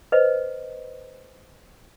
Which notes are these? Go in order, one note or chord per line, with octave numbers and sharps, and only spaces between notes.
B4 C5 D#5